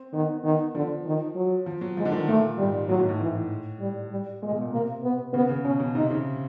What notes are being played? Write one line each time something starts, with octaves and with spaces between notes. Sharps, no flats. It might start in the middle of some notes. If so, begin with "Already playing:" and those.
Already playing: C4
D#3 B3
D#3 B3
D3 F3
D#3
F#3
F3
F#3
F3 G#3
D3
D#3
A#2 A3
G#2 G3
A2 F#3
G#2
A2
A2 E3
G3
G3
A#2 G#3
B2
A#2
C3 A#3
B3
C#3 B3
C#3
B2 C#4
B2
C3 D#4
C#3